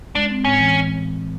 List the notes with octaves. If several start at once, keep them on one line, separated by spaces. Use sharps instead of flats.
G#3 D4
C4
A2 C#4
E3